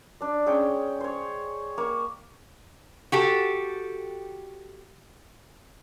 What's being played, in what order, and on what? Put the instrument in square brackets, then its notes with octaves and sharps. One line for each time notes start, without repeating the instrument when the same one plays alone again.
[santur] D4 D5
G#3 C#4 C#5 G5
C5 C#5
A#3 C#6 D6
[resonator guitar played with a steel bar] F#4 G4 A4